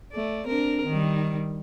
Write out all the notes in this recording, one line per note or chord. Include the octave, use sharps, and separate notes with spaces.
A3 D5
C4 D4 A#4
D#3 G3